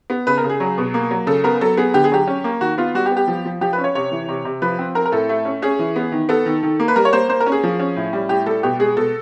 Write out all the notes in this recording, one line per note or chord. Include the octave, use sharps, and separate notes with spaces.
B3
C#3 B4
A#4
C#3
G#4
F#3
B2
A#3
F#3
C#3 A4
B3 A#4
F#3 A4
B3 G#4
D3 G4
G#4
F#3 G4
C#4
A#3
D#3 F#4
B3 F4
G3 F#4
G4
B3
G4
F3
F3
F3 G4
B4
C#4
C#5
C3 C#5
E3
C3
C3
F3 B4
C4
C4 A#4
A#4
A2 A4
A3
C#4
C#4 G#4
E3
B3
D#3
B3 A4
D#3
D#3
A#3
B4
G3 A#4
C#5
A#3 C5
A#3 C5
A#4
C#4
G#4
F3
C#4
A2
G3
A2 G4
G3 A4
B2 G4
G#3 G#4
B2 A4